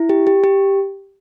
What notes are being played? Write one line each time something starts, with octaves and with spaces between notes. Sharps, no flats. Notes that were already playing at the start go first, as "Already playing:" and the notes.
Already playing: E4
G4
G4
G4